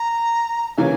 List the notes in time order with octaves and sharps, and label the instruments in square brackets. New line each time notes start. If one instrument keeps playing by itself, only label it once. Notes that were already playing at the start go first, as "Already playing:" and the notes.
Already playing: [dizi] A#5
[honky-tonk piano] C#3 E3 A#3 C#4 [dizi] G#5